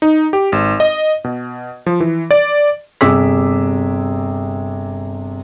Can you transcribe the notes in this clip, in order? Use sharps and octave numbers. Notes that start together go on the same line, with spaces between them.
D#4
G4
G#1
D#5
B2
F3
E3
D5
G1 C3 G#4 D6 E6 B6